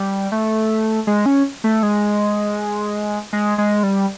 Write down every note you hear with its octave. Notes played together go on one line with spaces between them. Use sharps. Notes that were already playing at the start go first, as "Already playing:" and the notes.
Already playing: G3
A3
G#3
C#4
A3
G#3
G#3
G#3
G3